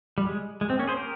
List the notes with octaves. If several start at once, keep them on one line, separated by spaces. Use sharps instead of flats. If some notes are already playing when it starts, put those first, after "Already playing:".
G3
G#3
G#3
C4
A#3 C#4
G#4 C5
G4 A#4